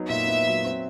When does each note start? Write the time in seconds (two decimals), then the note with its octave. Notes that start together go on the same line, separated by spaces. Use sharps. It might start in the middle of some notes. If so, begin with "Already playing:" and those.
Already playing: F#3 B3 D#4
0.09 A#2 E5
0.28 B3
0.46 F#3
0.65 C4